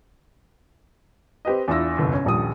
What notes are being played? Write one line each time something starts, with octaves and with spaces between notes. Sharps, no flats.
C4 G4 B4 D#5
E2 D4 E4 F4 E6 A#6
G1 C2 F2
C#4
D#1 A#1 G3 D#6